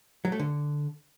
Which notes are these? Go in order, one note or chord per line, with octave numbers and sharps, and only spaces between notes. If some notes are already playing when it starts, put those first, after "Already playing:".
F#3
A3
D3